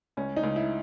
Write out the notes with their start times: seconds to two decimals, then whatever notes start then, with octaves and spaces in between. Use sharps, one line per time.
0.17 C#2 C#4
0.36 D#4
0.43 C#2
0.56 E4